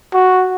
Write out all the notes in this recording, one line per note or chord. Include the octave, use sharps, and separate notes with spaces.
F#4